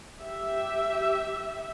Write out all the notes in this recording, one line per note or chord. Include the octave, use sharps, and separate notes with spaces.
G4 E5